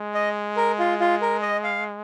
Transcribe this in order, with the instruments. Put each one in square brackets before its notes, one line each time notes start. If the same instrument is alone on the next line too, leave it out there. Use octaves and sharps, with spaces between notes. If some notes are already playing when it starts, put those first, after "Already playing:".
Already playing: [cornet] G#3
[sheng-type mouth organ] D#5
A#4
F4
F4
A#4
D#5
F5